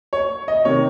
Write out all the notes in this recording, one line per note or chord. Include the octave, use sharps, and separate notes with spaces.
C#5
D#5
C3 D#3 C#5